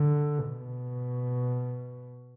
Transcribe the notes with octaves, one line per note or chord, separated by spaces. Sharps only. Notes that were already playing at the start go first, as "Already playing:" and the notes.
Already playing: D3
B2